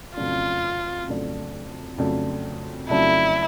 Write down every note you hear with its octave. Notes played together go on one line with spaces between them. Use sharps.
F2 C#3 F#3 A3 D4 F4
F2 C#3 F#3 A3 D4
F2 C#3 F#3 A3 D4
F2 C#3 F#3 A3 D4 E4